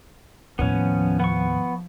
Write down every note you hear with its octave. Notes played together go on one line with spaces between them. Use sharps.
D#2 A2 F3 B3 C#4
B3 C#6